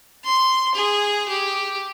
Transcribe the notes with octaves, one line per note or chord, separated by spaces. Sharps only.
C6
G#4
G4